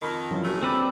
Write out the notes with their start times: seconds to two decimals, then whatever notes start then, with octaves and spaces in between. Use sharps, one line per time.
0.02 F2 D#3 B5
0.31 F#2 E3 F3
0.44 F#1 G2 F#3 G#3 A3
0.63 C4 B4 D5 E6